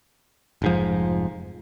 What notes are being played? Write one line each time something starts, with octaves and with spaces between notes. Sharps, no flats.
F1 G#2 F3